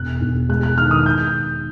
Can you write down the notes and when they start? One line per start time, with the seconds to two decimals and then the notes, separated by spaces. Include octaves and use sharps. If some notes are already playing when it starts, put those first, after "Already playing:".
Already playing: E1 F#6
0.21 E1
0.49 G#3 F#6
0.63 F#6
0.78 D#3 F6
0.91 D#6
1.06 G6